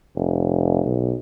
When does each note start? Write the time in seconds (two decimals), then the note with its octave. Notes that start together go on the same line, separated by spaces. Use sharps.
0.16 F1
0.86 B1